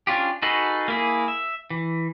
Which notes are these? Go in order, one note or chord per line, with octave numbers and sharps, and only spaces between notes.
C#4 D4 F4 G4
D#4 F#4 G#4 A4 B4
A#3 E4 G#4
E5
E3